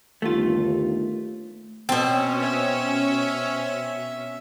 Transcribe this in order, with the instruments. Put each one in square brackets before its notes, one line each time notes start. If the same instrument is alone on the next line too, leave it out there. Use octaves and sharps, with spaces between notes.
[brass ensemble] G1 D#2 [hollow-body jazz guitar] A3 F4
[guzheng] B2 A5 [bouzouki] C4 [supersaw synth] C#4
[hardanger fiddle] E5